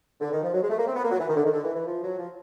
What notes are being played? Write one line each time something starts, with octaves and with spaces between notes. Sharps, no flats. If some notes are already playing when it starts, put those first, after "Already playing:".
D3
D#3
F3
F#3
G#3
A3
A#3
C4
B3
A#3
F#3
E3
D#3
D3
D#3
D3
E3
E3
F3
F#3
F3